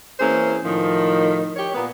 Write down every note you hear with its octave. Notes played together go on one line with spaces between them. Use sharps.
E3 A#3 C4 C#4 G#4 C5
A2 D#3 F3
G4 C#5
A#2 B3